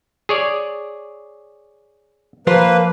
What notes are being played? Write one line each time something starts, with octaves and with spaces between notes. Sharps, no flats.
G#4 C#5 D5
F3 A#3 F4 B4 C5